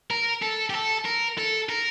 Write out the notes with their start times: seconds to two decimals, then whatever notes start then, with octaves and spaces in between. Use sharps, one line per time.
0.11 A#4
0.42 A4
0.70 G4
0.74 A4
1.06 A#4
1.38 A4
1.69 A#4